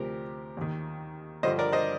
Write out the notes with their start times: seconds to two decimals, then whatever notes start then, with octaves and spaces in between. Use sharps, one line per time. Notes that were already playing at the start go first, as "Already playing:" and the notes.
Already playing: D2 C3 F3 G4 A#4
0.57 D#2 D#3
1.43 G2 D3 F3 C5 D#5
1.59 A#4 D5
1.73 C5 D#5